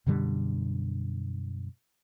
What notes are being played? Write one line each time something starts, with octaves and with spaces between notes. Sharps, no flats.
F#2 B2 D3 G3